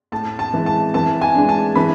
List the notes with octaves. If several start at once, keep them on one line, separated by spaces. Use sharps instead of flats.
A2 A5
A5
E3 G#3
A5
E3 A5
G#5
G#3 D4
A5
E3 B5